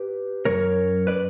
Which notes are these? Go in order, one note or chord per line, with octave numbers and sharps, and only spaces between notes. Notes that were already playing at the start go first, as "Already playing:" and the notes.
Already playing: G4 B4
F#2 E3 A#4 C#5
B4 D5